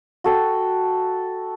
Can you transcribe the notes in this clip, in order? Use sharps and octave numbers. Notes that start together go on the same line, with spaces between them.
F#4 A4 G5